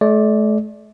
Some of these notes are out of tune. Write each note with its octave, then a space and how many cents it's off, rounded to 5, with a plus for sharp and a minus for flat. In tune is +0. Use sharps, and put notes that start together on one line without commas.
A3 -40 D5 +0